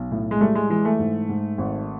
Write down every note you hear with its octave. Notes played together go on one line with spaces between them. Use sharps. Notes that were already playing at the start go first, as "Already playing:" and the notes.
Already playing: B1
A2
G#3
G3 A3
G#3
E3 G#3
A3
G#2
G#2
G#1